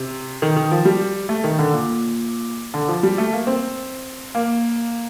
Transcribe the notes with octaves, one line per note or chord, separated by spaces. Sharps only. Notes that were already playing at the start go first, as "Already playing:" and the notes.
Already playing: C3
D#3
D#3
F3
G3
A3
D#3
D3
A#2
D3
F3
G3
A3
A#3
C4
A#3